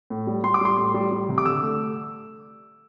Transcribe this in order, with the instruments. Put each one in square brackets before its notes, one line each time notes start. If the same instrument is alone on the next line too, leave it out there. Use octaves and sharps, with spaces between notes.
[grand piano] A2
G3
G3 C6
D6
G3 C6
A2
G3
G3
C3
D6
D3 E6
A3